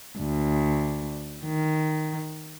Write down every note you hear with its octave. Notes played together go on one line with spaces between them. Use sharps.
D2
D#3